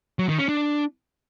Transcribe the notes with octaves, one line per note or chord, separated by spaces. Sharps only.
F#3
D#3
C#4
D4